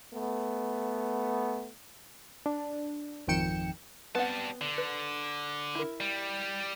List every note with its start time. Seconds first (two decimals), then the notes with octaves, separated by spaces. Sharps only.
0.13 A3 B3
2.46 D4
3.27 G#1 F2 D#3 G5 C#7 E7
4.15 G3 B3 C4 F#5 A5
4.61 D3
4.78 B4
5.75 E4 A#4
6.00 G3